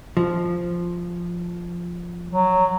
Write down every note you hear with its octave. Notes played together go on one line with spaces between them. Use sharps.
F3
F#3